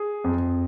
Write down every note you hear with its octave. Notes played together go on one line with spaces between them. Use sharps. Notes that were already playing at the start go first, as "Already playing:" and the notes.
Already playing: G#4
F2